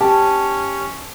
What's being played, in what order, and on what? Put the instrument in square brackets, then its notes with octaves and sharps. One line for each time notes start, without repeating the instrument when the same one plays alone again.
[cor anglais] C#4 [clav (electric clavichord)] G4 [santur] A5